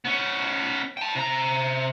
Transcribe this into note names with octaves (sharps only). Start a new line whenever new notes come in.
B3 C#4
G5 A5
C3 A#5